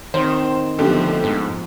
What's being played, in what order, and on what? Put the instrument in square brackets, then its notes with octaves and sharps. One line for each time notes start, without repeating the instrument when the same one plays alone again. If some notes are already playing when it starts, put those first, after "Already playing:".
[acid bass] D#3 [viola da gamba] C4 [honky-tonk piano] C5
[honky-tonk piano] B1 D3 G4 [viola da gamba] F3 A3 B3
[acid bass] G#2 [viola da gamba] F3